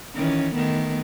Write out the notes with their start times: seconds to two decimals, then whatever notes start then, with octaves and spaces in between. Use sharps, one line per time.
0.15 D#3 E3 C#4
0.55 D#3 A3 B3